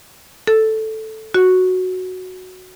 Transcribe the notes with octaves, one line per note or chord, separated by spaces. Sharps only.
A4
F#4